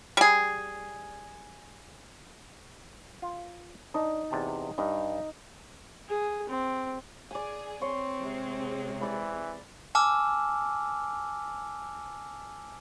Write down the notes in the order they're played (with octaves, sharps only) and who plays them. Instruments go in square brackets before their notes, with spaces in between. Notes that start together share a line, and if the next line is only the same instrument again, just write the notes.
[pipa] G3 G#4
[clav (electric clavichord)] F4
[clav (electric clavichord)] D4 [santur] D#4
[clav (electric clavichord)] E2 C3 A5
[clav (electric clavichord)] G2 [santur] D#4
[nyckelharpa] G#4
C4
[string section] G#4 [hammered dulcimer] D5 G#5
[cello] C4 [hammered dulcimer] C#5 C6
[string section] C3 G#3
[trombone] E3 [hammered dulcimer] D5 B5
[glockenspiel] G#5 A5 D6 E6 F6